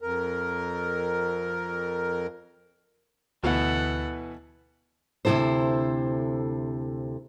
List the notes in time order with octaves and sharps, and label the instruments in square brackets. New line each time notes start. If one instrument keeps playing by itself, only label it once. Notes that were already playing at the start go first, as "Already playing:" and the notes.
[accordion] F2 A#4
[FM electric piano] D2 [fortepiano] B2 E3 B3 [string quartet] A4 F#5
[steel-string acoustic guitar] D2 C3 E3 E4 A4 C5